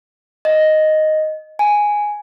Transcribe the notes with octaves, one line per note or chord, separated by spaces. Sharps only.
D#5
G#5